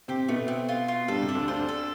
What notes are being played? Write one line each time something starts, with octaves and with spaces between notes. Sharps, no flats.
C3 C4 G4
B2 A3 B3
C4
F4
F4
G2 G3 A4
C3
D4
D2 D3
D2 D3 C5
A4